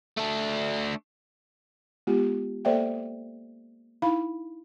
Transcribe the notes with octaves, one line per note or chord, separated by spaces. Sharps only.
A3 D4
G#3 B3 F4 G4
A#3 A4 C5 D5 E5 G5
D#4 E4 F5 B5